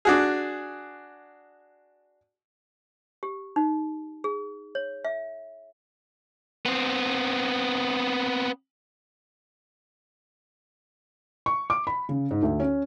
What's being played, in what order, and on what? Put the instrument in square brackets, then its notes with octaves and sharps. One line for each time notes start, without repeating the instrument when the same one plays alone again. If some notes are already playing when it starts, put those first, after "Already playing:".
[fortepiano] D4 F#4 G#4
[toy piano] G4
D#4
G#4
C#5
E5
[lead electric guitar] B3 C4
[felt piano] C#6
D6
B5
C#3
G#2
D2
C#4